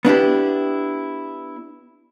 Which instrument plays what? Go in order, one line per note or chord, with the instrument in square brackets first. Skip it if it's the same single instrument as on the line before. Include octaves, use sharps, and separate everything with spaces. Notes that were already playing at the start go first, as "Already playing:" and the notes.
[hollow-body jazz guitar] B3 D4 E4 G4